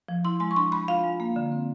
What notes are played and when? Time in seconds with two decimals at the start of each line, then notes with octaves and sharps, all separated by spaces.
0.08 F3
0.25 E4 C6
0.40 G#3 C6
0.51 C#6
0.56 D4 C6
0.72 G#3 B5
0.88 F4 F5
1.04 G#3
1.20 A#3
1.36 D3
1.52 C4